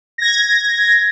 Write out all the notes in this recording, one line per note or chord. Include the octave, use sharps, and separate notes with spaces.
G#6 A#6